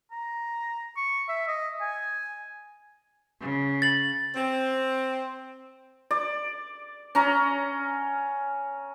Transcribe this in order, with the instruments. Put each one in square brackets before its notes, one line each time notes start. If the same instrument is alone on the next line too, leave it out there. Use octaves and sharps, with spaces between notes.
[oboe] A#5
C#6
E5
D#5
G#5
[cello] C#3
[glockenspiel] A6 F#7
[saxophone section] C4
[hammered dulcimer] D5
C#4 A#5